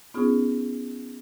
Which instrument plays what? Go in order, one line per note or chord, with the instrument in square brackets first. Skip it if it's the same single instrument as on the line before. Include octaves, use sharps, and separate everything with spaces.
[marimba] B3 C#4 D#4 F4 G#4